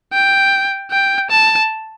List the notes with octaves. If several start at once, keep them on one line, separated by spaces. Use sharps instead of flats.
G5
G5
A5